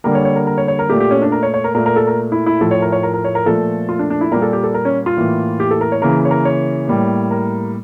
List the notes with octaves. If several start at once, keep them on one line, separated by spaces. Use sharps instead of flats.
D3 G3 A#3 A#4
C#5
C#5
A#4
A#4
C#5
C#5
A#4
A#2 A3 G4
G4
C#4
D4
A#4
C#5
C#5
A#4
A#2 A3 A#4
A#4
A4
A#4
E4
E4
A2 F3 A3 A4
C#5
A#4
C#5
A#4
A#4
C#5
A#4
A#2 F3 A3 A4
F4
D4
D4
E4
A#2 G3 A#3 A#4
A4
G4
A4
A#4
C#4
F4
A2 E3 A#3
G4
A4
A#4
C#5
C#3 E3 A#3 A#4
C#5
A#4
C#5
A2 G3 A#3
A#4